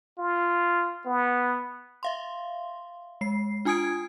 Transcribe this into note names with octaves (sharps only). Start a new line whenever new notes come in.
F4
B3
E5 F5 C6
G#3 C7
D4 F4 G#5 D#6 G#6 D7